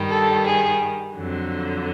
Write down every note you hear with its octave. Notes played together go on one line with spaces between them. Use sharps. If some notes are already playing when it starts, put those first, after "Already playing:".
Already playing: G2 D#3 G3
A4
G#4
F2 D3 F#3